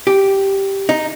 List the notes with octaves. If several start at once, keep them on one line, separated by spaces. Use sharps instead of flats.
G4
D#4